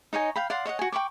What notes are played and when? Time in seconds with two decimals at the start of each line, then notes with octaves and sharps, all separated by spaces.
0.13 D#4 C#5 D#5 G#5
0.36 F5 G5 B5
0.50 D5 F5 F#5 C6
0.66 C#5 D#5 E5 F#5
0.79 F#4 G#5
0.92 G5 B5 C#6 D6